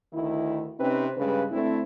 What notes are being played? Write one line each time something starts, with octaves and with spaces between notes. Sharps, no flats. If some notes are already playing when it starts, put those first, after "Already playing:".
D2 D#3 D#4 E4
C3 C4 C#4 D#4 B4
G2 C#3 G#3 B4
D2 A3 C4 D4 E4